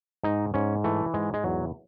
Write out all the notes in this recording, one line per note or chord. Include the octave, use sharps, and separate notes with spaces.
G#2 D#4
G#2 C#4
E3 A3
G#2 G#3
G#3
E2 F#3